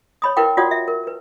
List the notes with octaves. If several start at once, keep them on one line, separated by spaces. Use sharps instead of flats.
C#5 B5 D#6
E4 A#4 B4 F5 G5 D6
F4 F#4 C#5 D5 F#5 D#6
E5
A#4
A#4 B4